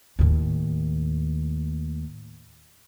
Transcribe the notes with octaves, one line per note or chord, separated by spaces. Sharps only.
D#2 A2